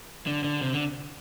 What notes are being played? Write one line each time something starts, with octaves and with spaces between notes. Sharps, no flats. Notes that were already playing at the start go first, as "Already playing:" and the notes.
D3
D3
C3
D3